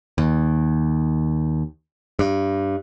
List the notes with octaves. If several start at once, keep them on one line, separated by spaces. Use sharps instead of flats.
D#2
G2